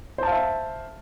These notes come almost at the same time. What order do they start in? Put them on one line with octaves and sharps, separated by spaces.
C5 A5 F5 E5